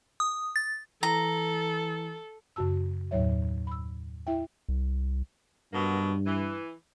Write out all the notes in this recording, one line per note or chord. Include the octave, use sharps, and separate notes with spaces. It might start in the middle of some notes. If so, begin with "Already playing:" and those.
D#6
A6
E3 A4 A#5
F#2 C#3 F#4 A5 E6
D#2 A2 F#3 C#5 E5
B5 E6
E4 E5 G5
C2
G2 B2 F#3 A#3
E3